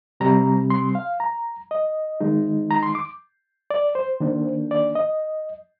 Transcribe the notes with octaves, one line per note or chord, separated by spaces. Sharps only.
C3 G3 C4 A#5
C6
F5
A#5
D#5
D#3 G#3 D#4
A#5
C6
D6
D5
C5
D#3 A#3 D4
D5
D#5